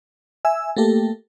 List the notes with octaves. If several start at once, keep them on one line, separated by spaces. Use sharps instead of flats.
E5 G#5 E6
A3 A#3 G4 A4